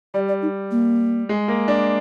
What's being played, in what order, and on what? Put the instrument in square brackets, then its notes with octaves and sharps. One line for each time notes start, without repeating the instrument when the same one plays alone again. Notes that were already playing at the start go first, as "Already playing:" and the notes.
[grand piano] G3 [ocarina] D5
[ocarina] D5
D#4
A#3
[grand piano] G#3
A#3
D4